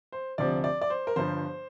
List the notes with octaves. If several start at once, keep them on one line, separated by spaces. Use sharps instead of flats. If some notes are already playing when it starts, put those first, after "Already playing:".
C5
D2 C3 F3 D5
D5
D5
C5
A#4
G1 G2 F3 C5